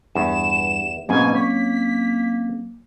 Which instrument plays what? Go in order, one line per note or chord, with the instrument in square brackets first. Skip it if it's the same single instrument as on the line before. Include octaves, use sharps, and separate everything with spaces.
[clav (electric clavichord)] E2 [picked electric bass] G2 [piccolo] E7
[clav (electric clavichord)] G#2 B2 [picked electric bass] F#3 C4 C#4 [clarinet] A#3 [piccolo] G#5
[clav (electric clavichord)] C#5 [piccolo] B6